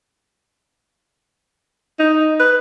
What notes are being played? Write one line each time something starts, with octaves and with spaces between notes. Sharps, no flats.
D#4
B4